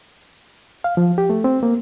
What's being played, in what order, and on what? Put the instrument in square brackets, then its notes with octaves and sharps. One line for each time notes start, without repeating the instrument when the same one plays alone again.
[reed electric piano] F5
F3
G4
A3
C4
A#3